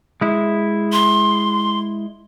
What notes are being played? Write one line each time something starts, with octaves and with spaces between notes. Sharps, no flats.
G#3 E4
C6